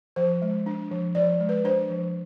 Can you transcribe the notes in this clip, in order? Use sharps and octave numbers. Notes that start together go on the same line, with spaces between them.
F3 C5
G#3
D4
F3
F3 D5
G#3
B4
D4 C5
F3